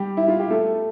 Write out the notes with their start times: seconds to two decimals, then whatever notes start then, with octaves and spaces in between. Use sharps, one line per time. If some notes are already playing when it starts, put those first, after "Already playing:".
Already playing: G3 G4
0.17 E4
0.28 F4
0.40 G4
0.50 A3 A4